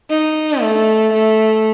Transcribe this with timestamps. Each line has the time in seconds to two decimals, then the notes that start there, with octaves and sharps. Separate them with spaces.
0.10 D#4
0.62 A3
1.13 A3